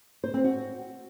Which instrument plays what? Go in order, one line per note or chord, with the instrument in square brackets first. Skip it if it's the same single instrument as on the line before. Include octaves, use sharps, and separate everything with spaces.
[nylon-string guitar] C5
C4
F#4